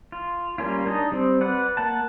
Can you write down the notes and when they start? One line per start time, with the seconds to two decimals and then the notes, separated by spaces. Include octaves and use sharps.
0.12 F4
0.58 G3 A#3 C#4 F4
0.87 D4 D#4 D#5
1.12 G3 C4
1.41 B4 D5 F#5
1.77 A#3 F#5 A5